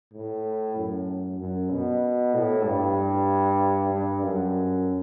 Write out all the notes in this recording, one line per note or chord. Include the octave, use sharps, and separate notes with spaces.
A2
F#2
F#2
B2
A2
G2
G2
F#2